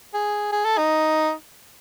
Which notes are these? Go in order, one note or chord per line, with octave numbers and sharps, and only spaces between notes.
G#4
G#4
A4
D#4